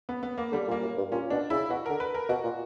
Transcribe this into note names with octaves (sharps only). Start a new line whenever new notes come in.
B3
B3
A#3
D3 G3
A#2
A#3
F#2
G2
A#2 C#4
B2 D4
C#3 E4
B2 F#4
D3 A#4
B4
A#4
B2 F#4
A#2